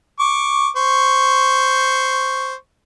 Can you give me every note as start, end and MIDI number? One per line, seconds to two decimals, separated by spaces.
0.20 0.69 85
0.20 0.69 86
0.76 2.55 72
0.76 2.55 85